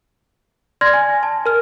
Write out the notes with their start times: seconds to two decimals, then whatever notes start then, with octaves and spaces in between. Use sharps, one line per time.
0.81 D5 C6 F6 G#6 A#6
0.94 G#5
1.23 A5
1.46 A#4 F6